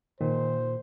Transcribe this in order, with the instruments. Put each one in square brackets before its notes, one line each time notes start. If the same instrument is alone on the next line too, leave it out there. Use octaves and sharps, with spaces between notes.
[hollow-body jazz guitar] A#2 [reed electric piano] D#3 [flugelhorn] C5